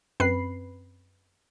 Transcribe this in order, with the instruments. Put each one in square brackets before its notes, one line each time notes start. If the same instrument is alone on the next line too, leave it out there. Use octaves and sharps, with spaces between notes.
[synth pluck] F#2 C4 B4 B5 C7